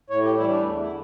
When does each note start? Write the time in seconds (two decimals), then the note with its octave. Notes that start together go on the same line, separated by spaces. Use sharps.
0.10 A2 C#5
0.23 G4
0.36 E3 G3 E4
0.49 D4
0.62 E2 A3
0.80 E4
0.87 D3